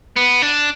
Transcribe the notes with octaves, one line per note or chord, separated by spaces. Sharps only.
B3
D4